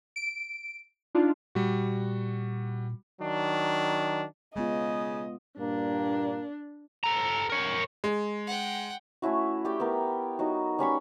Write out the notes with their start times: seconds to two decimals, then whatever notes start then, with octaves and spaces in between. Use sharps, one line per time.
0.16 D7
1.15 D4 D#4 F4
1.55 A#2 G3 F#4
3.21 D#3 F#3 D4
4.56 C#3 G#3 B3 F4 D#5
5.58 G2 A#2 A#3 D4
7.04 A4 A#5
7.50 A#4 C#5
8.04 G#3
8.47 F#5 G5
9.22 A3 C#4 E4 F#4
9.65 G4 D5 G5
9.80 B3 A#4
10.39 F#3 D#4 F#4
10.79 G3 C#4 B5 C#6